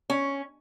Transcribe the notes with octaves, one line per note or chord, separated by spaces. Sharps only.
C#4